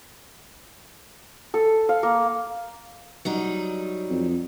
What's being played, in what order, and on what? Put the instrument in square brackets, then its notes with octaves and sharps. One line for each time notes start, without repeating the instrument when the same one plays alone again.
[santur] A4
F5
A#3
[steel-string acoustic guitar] F#3 G3 D#4
[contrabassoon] F2